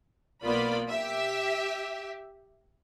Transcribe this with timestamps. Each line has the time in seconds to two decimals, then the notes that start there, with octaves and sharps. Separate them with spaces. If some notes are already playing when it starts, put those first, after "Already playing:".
0.44 B1 A#3 B3 F4 D5 B5
0.90 G4 E5